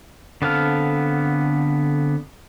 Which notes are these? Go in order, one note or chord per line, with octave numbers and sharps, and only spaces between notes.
D3 B3 C4 A4 F5